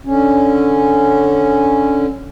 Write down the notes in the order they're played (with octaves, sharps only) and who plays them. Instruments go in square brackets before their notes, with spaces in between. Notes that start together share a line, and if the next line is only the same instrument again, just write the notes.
[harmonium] D3 C#4